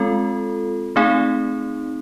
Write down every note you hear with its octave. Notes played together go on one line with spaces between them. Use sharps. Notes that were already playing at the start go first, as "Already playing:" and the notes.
Already playing: G#3 C4 F4 A4
A3 C4 D#4 G#4